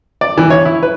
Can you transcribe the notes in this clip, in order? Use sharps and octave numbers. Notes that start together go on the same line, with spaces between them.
D5
E3
C#5
E4
B4